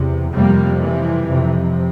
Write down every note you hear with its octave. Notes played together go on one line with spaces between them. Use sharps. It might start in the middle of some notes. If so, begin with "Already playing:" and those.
Already playing: E2 C3
F2 C3 G3 A#3
E3 G3
F2 C3